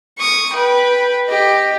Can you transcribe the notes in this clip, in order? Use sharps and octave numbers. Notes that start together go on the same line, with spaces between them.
C#6 D#6
B4 G5
G4 D#5